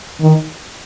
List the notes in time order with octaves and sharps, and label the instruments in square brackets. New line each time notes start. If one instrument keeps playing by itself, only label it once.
[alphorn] D#3